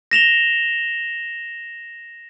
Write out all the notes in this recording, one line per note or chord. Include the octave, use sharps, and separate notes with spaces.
A#6 E7 F7 G7